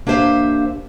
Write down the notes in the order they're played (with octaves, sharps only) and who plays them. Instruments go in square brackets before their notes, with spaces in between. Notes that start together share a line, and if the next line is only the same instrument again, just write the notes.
[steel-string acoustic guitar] A#3 D4 G4 C5 E5 F5